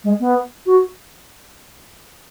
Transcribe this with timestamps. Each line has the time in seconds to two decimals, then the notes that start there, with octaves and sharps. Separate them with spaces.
0.04 G#3
0.20 B3
0.66 F#4